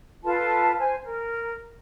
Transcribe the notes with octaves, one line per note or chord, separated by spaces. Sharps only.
F4 A4 B4 A5
C5 G#5
A#4